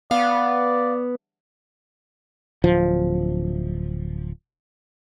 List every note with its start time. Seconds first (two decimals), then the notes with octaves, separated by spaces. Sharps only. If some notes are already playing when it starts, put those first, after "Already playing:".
0.11 B3 D5 F5
2.64 D1 F3